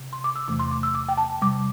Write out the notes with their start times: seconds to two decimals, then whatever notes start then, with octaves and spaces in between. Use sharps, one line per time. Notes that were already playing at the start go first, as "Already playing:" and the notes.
Already playing: C3
0.13 C6
0.24 D6
0.36 E6
0.48 E2 C3 E3 A3 D6
0.59 C6
0.71 D6
0.83 E6
0.95 D6
1.09 G5
1.17 A5
1.42 C3 G3 D6